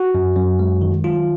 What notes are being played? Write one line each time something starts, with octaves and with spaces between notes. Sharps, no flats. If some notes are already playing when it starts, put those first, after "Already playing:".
Already playing: F#4
F#2
F#2
G#3
D#3
F#3 F4